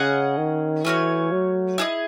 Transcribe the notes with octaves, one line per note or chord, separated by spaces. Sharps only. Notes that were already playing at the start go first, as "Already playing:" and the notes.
Already playing: C#3 C#4 G#4 D#5 F#5
D#3
E3 A3 C#4 F#4 C#5
F#3
E4 G#4 D#5